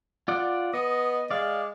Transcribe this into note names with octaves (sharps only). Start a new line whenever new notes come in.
F4 D5 F#5
B3 D#5
G#3 D5 F5